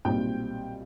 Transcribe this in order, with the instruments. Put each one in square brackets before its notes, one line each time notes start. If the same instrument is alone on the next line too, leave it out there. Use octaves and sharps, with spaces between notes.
[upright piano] B1 A#2 G3 C4 G5